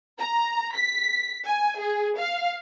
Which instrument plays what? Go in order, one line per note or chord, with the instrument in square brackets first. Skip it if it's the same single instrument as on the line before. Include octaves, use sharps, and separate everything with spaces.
[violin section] A#5
B6
G#5
G#4
F5